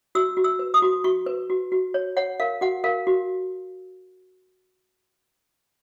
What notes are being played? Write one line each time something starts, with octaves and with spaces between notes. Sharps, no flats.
F#4 E6
F#4
E6
B4
D#6
F#4
F#4 C#6
B4
F#4
F#4
C#5
C#5 F#5
A#4 F5
F#4 F#5
A#4 F5
F#4